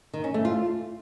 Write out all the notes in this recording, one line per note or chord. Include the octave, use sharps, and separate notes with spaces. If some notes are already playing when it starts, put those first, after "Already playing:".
D#3
C#4
A3
F4